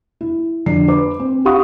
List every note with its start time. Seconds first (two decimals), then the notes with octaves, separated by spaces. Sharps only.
0.21 E4
0.66 F2 D3 D4 C7
0.88 B4 C5 D6
1.20 C4
1.45 D#4 G4 F5 F#5 C#6 D#6